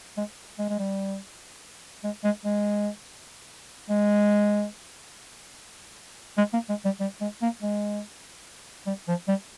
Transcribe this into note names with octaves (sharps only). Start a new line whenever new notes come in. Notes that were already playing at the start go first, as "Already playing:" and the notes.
G#3
G#3
G#3
G3
G#3
G#3
G#3
G#3
G#3
A#3
G#3
G3
G3
G#3
A#3
G#3
G3
F3
G3